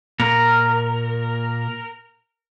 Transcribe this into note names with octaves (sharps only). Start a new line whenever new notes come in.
A#2 A#4